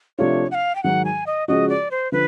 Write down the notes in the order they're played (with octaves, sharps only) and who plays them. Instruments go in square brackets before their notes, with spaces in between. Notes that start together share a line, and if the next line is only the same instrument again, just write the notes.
[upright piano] C3 F3 A3 D4 F4 [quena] C#5
[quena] F#5
F5
G5
[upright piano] G#2 D#3 F#3 [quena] F#5
[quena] G#5
D#5
[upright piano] C#3 F3 G#3 C#4 F#4 [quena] D#5
[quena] D5
C5
[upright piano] D3 F3 [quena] B4